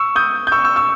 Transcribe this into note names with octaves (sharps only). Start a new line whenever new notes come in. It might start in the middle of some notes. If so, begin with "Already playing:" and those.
Already playing: C#6 E6
D#6 G6
G6
C#6 E6
C#6 E6
C#6 E6